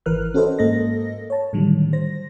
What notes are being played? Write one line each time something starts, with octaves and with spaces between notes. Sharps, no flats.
G#1 E3 A#4 B4 F6 F#6
C#4 F#4 A4 B4 C5 D#5
G#2 A#3 A4 A#4 D#5 A#6
C#5 A5
A2 D3 D#3 F#3 G3
C5 A#6